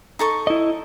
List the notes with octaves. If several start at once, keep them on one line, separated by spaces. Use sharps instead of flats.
D#4 A4 C#6
E4 D#5